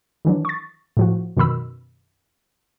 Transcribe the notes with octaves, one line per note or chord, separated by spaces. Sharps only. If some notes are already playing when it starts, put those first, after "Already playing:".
D#3 E3 F#3 D4
C#6 A6
A2 F3 F#4
F#2 B2 D#3 B5 E6